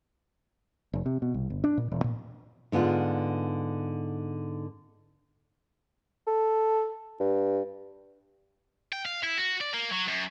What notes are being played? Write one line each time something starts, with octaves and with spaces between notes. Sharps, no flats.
F1
C3
B2
C2
G1
D4
A#2
E1
A#2
G#2 D3 B3 D4 F4
A4
G2
G5
F5
E4
F#4
D5
A#3
F#3
F#2